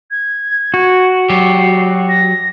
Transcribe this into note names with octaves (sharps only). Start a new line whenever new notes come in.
G#6
F#4
F#3 G4 C7
A#6